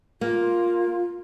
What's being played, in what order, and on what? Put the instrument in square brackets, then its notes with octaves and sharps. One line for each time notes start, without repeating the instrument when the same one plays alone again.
[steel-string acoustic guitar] A#3 [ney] F4